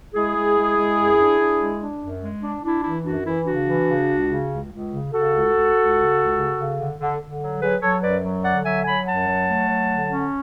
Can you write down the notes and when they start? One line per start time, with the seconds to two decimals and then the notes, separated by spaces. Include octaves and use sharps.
0.14 G#3 E4 G#4
0.35 G#3
0.55 G#3
0.76 G#3
0.96 F#2
1.18 D4
1.38 D4
1.59 G#3
1.80 D4
2.00 F#2
2.21 G#3
2.42 D4
2.63 D4 E4
2.83 E3 E4
3.04 F#2 D4 F#4
3.25 E3 E4
3.46 C#3 D4 F#4
3.66 E3
3.87 C#3
4.08 C#2
4.29 C#3
4.49 C#2
4.71 C#2
4.91 C#3
5.11 C#3 F#4 A4
5.32 C#2
5.53 C#2
5.74 C#2
5.95 C#3
6.16 C#2
6.36 C#3
6.57 C#3
6.78 D3
6.98 D3
7.19 D3
7.40 F#3
7.60 F#3 G#4 B4
7.81 F#3 A4 C#5
8.02 F#2 B4 D5
8.23 F#3
8.43 D3 D5 F#5
8.64 F#3 E5 G#5
8.85 F#3 G#5 B5
9.06 F#2 F#5 A5
9.27 F#3
9.48 A3
9.68 F#3
9.89 D3
10.10 C#4